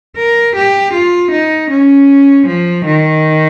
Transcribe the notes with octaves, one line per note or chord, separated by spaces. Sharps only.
A#4
G4
F4
D#4
C#4
F3
D#3